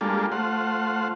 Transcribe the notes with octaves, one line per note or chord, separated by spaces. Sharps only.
G3 G#3 A#3 D4 F4 A4
A3 F4 C5 F#5